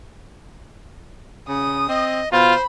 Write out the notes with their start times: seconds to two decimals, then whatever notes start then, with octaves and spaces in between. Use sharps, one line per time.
1.49 C#3 D#6
1.89 C4 D#5
2.32 B2 F4 C5 B5